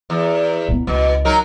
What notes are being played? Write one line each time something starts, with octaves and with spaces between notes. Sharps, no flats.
E2
A#2 B3
C#2 B2
F#3 D#4 A#4